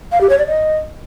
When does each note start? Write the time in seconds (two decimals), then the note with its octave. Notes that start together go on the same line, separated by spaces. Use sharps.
0.12 F5
0.21 G4
0.30 C#5
0.38 D5
0.47 D#5